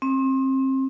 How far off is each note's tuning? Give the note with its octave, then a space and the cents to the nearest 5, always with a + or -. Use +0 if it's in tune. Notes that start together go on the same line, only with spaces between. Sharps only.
C4 +30